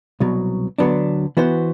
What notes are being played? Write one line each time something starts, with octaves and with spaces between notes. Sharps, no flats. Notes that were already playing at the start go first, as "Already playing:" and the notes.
C2 B2 F#3
D2 D3 F#3 B3 D4
E3 B3 F#4 C5